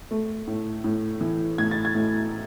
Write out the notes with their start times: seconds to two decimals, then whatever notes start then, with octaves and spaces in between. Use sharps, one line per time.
0.11 A3
0.47 A2
0.84 A2
1.21 E3
1.58 A2 G#6
1.71 A6
1.85 G#6
1.95 A2